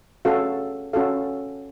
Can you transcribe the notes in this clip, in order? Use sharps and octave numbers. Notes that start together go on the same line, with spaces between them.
C#4 F#4 A4 F5
C#4 F#4 A4 F5